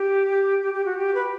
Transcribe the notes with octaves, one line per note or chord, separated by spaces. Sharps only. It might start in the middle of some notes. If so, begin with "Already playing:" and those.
Already playing: G4
G4
G4
F#4
G4
B4